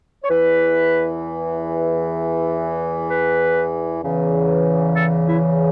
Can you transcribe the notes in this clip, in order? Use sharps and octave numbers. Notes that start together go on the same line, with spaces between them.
C#5
E2 E3 B4
B4
E2 C#3 E3
A4
E4